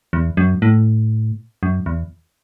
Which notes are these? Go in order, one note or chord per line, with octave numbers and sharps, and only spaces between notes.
E2
F#2
A2
F#2
E2